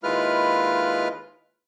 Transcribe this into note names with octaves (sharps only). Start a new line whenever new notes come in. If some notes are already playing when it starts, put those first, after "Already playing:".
D#2 G#3 E4 F4 B4 F6